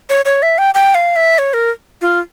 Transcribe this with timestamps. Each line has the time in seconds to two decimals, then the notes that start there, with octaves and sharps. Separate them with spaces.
0.10 C#5
0.25 C#5
0.43 E5
0.58 G5
0.74 G5
0.95 F5
1.16 E5
1.38 C#5
1.54 A#4
2.01 F4